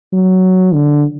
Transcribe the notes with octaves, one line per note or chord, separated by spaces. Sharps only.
F#3
D3